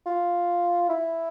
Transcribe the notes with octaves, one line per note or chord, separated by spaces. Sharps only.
F4
E4